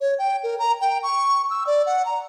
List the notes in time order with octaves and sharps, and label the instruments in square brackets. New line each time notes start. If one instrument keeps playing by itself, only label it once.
[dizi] C#5
G5
A#4
A#5
G5
C#6
E6
D5
F#5
A#5